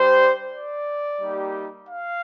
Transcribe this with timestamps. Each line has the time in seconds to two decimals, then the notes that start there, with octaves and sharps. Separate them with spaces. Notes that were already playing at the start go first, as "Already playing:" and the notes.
Already playing: G3 D4 G4 C5
0.52 D5
1.21 G3 A#3 D#4 G4
1.89 F5